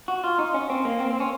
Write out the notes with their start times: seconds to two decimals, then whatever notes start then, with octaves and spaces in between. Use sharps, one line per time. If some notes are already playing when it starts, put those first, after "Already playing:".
0.08 F#4
0.24 F4
0.39 D#4
0.54 C#4
0.70 C4
0.85 A#3
1.00 C4
1.10 C4
1.20 C#4